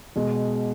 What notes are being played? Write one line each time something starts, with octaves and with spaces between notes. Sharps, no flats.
B2 G#3